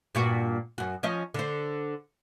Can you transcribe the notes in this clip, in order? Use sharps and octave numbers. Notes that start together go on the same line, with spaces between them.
G2 A#2 F#4
F#2 F#4
F3 C#4 D#5
D3 C5